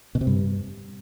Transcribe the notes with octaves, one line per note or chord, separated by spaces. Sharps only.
B2
C3
G2